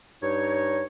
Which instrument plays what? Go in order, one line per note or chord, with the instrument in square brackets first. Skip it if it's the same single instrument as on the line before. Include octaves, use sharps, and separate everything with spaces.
[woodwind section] G2 D#4 C#5